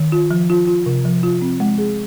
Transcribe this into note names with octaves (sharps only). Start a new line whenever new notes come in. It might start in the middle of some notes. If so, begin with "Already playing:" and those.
Already playing: D#3
F4
F3
F4
F4
C3
F3
F4
C4
G#3
G#4